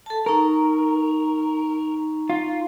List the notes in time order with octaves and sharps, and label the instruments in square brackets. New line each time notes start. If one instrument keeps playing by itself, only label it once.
[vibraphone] A4 A5
[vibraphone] D#4 A#5 C#6 [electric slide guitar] A#4
[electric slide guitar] F4